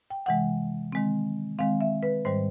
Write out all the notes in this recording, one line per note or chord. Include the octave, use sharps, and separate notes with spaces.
G5
C3 E3 G#3 F#5
D#3 G#3 C4
D#3 G#3 C4 F5
E5
B4
G#2 D#3 G3 C5